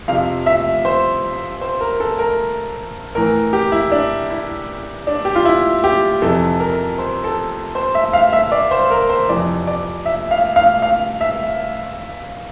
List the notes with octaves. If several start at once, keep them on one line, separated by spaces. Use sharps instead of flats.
F2 C3 F3 F5
E5
C5
C5
A#4
A4
A#4
A2 E3 A#4
G4
E4
D4
E4
D4
G4
F4
E4
G4
F2 C3 E3 A4
A#4
C5
A4
C5
E5
F5
E5
D5
C5
A#4
C5
F2 C3 E3 D5
D5
E5
F5
F5
F5
E5